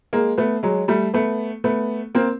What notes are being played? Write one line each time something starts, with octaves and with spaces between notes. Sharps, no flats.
G#3 A#3
A3 B3
F#3 G#3
G3 A3
A3 B3
A3 B3
A#3 C4